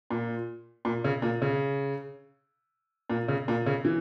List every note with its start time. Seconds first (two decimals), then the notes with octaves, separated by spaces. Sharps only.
0.10 A#2
0.85 A#2
1.04 C#3
1.22 A#2
1.42 C#3
3.10 A#2
3.28 C#3
3.48 A#2
3.66 C#3
3.85 E3